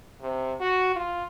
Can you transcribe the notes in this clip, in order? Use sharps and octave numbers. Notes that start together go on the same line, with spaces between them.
C3
F#4
F4